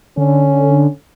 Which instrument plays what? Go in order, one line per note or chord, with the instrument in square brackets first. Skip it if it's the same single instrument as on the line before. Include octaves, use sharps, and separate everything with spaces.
[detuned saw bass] D3 [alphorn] C#4